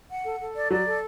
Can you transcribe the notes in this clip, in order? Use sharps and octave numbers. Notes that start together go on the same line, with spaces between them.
F#5
A4
A4
D5
F#3 D5
A4